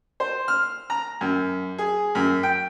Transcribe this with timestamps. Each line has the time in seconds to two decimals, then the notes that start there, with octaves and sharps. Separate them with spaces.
0.20 C5
0.48 F6
0.90 A#5
1.21 F#2
1.78 G#4
2.15 F#2
2.43 G5